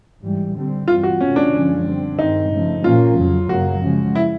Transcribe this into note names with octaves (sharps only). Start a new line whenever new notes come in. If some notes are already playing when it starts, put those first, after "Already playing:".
G#2 E3 G3
D3 G3 C4
G2 E3 G3 C4 F4
F#4
C3 E3 A3 C#4
D4
F#2 D3 F3 G#3 C#4
D3 G3 C4
G2 D#3 G#3 C4 D#4
C#3 F3 A3
A#2 F3 A#3 C#4 F4
F2 C#3 F#3
F#2 C#3 F#3 A#3 F#4
C#3 F3 G#3
E4